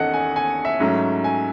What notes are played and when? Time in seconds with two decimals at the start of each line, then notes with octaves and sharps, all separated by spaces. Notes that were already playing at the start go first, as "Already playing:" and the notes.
Already playing: E2 D#3 C#4 A4 D#5 F#5
0.13 G#5
0.36 G#5
0.65 E5
0.80 G#2 F#3 A3 C#4
1.24 G#5